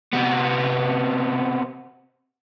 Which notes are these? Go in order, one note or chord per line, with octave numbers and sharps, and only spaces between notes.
C3 B3